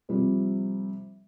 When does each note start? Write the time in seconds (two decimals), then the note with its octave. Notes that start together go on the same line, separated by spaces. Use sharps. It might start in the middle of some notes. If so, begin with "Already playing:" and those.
0.09 C3 F3 G3